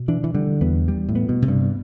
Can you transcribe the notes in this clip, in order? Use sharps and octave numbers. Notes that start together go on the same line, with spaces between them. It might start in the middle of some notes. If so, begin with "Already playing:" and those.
Already playing: B2
E3 D4
E3
D3 G3
E2 B3
G3
A2
B3
B2
C3
G2